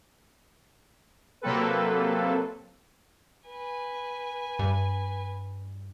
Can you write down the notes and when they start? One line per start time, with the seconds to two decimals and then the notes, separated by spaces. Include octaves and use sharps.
1.42 C3 F#3 A#3 C4 A4 B4
3.47 B4 G#5
4.59 G2